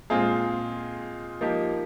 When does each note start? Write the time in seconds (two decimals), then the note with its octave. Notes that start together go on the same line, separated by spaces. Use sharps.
0.10 A#2 G#3 C4 F4 G#4
1.41 F3 A#3 D#4 G4